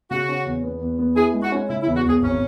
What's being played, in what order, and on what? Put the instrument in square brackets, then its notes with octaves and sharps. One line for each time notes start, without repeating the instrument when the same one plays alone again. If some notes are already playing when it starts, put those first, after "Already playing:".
[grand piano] C#3 [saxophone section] F#4
[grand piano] C#4
E2
B3
E2
B3
[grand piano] E4 [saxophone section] G#4
[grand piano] G#3
[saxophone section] F#4
[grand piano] C#4
[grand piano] C#3 [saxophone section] E4
[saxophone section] E4
[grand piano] E2
[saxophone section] F#4
[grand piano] E1 [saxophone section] G#4
[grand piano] G#1 [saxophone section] C#4